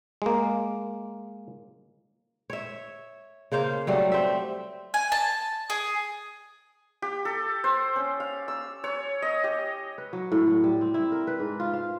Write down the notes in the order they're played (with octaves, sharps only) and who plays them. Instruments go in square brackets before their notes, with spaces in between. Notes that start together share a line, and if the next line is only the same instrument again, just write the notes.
[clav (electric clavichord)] G#3 A#3
[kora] C#5 E5
C#3 A#3 C5 F5
F#3 G3 A3
C4 E5
[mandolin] G#5
A5
G#4
[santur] G4
A4
C5
C#4
F5
E6
C#5
D#5
G4
[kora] B4
F#3
A2
F#3
G3
C4
E4
A#4
B4
G#2
F4
F5